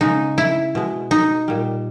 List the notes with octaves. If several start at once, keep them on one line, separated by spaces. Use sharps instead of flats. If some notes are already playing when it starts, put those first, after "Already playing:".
C#3 G#3 D#4
E4
B2 G#3
D#4
A#2 G3